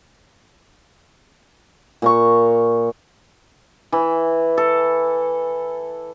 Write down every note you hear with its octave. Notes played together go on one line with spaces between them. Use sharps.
A#2 A#5 C#6
E3
A4